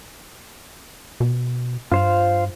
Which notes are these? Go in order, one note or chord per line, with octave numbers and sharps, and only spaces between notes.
B2
G2 F4 C5 F5